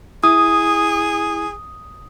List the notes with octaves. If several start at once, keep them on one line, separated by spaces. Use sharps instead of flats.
E4 G#4 D#6